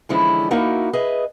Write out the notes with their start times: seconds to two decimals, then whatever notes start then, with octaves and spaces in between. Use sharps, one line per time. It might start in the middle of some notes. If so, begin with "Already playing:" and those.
0.09 D3 E3 F3 G#3 C#4 E4
0.51 A#3 D#4 E4 F#4 A#4
0.93 G#4 B4 D#5 E5